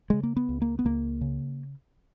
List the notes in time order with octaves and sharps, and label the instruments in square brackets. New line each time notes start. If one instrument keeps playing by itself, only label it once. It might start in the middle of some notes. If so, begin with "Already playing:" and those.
[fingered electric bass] C#3 G#3
A#3
B3
C#2
A#3
B3
C#2 A#3
C#3